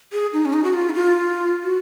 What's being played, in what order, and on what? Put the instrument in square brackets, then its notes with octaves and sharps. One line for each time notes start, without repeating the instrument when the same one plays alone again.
[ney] G#4
D#4
C#4
D#4
F#4
F4
D#4
F4
F#4